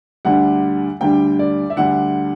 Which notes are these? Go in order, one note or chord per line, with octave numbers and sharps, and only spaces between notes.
D2 D3 G3 D4 F#5
D2 D3 G3 D4 G5
D5
E5
D2 D3 G3 D4 F#5